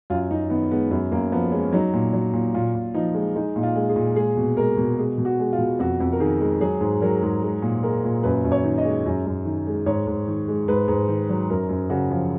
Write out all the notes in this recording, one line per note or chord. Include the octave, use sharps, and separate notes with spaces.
F#2 F4
F#2 D#4
D#3 B3
G#3 B3
F#2 B3
F#2 A#3
F3 B3
G#3 C#4
F#3 D#4
A#2
F#3
A#2
A#2 F4
A#2
F3 D#4
G#3
G#3 D#4
A#2 D#4
F4
G#3
G#4
A#2
G#3 G#4
B2
G#3 A#4
B2
G#3 G#4
B2
F#4
G#3
F4
B2
F2 F#4
F2
A#4
D#3 G#4
G#3
F#3 G#4
G#2
F#3 A#4
G#2
G#3
A#2
G#3 A#4
A#2
F#2 B4
F#2
C#5
D#3
D#5
G#3
F#2
F#2
D#3
G#3
G#2 C#5
G#2
D#3
G#3
G#2 B4
G#2
D#3
F#3
F#2 A#4
F#2
C#3 F#4
F3